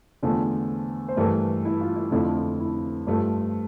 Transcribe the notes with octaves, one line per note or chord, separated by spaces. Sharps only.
E2 D3 F3 A3
C5
G2 E3 A3 A#4
E4
F4
E4
F2 D3 F3 A3 E4
E4
E4
G2 F3 A3